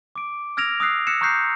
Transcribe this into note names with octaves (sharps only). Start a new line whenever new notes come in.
D6 D7
E6 F6 G#6 A#6 D7 F7
D#6 E6 F#6 C7
E6 F#6 G#6 A#6 C#7 E7
A#5 C#6 D#6 F#6 G6 C7